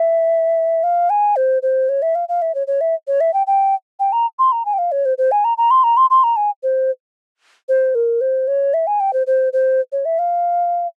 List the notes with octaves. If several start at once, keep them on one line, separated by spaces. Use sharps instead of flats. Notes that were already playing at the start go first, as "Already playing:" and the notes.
Already playing: E5
F5
G#5
C5
C5
C#5
E5
F5
F5
E5
C#5
C#5
E5
C#5
E5
G5
G5
G5
A#5
C6
A#5
G#5
G5
F5
C#5
C5
C5
G#5
A#5
A#5
C6
A#5
C6
C6
A#5
G#5
C5
C5
A#4
C5
C#5
E5
G#5
G5
C5
C5
C5
C#5
E5
F5